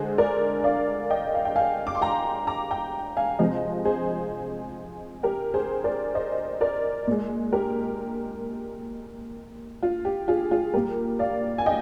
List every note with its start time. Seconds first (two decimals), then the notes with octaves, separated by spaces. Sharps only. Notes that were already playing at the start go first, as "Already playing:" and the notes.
Already playing: D3 G#3 G#4 C5
0.18 A#4 D5
0.64 D5 F5
1.10 D#5 G5
1.34 F5
1.45 G5
1.56 F5 G#5
1.87 D6
1.95 C6
2.01 G5 A#5
2.47 A#5 D6
2.71 G5 A#5
3.17 F5 G#5
3.39 C3 F3 G#3 C5 D#5
3.85 G#4 C5
5.23 G4 A#4
5.54 G#4 C5
5.84 A#4 D5
6.15 C5 D#5
6.61 A#4 D5
7.07 A#2 G#3
7.53 G4 A#4
9.83 F4
10.05 G4
10.28 F4 G#4
10.51 F4 G#4
10.73 A#2 G3 G4 A#4
11.19 D5 F5
11.58 G#5
11.66 D#5 G5